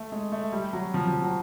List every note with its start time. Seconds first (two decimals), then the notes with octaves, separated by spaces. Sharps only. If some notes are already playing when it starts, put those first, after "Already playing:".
Already playing: A3
0.12 G#3
0.32 A3
0.52 G3
0.73 F#3
0.94 F3
1.07 F3
1.22 F#3